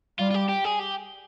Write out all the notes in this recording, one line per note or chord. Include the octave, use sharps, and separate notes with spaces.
G3 F4
F4
G4
G4
G#4
G4